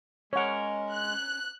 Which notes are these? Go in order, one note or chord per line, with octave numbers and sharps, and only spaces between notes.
G#3 C#4 A#4 C#5 F#5
F#6